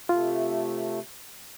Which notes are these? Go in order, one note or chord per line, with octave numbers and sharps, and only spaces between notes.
C3 A3 F4